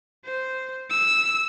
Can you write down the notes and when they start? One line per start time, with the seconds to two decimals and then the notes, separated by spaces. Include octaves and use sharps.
0.25 C5
0.90 E6